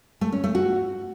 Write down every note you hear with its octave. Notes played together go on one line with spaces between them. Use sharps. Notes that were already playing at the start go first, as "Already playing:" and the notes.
A3
C#4
A3
F#4